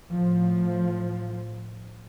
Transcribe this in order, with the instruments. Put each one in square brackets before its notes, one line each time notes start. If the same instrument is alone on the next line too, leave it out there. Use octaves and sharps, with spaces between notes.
[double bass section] A2 F3